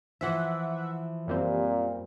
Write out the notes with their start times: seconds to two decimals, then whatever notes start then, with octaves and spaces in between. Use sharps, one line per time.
0.21 E3 F3 E5 F#5
1.28 F#2 A#2 G3 C4